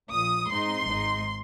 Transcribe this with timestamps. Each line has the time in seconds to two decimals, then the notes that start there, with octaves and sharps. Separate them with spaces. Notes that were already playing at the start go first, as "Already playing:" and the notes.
0.10 A#1 A#2 F3 D#6
0.48 G#2 G#3 C4 D#4 C6
0.87 G#1 G#2 G#3 D#4